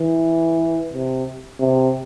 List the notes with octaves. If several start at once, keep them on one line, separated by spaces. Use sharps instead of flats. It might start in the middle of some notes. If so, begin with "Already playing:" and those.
Already playing: E3
C3
C3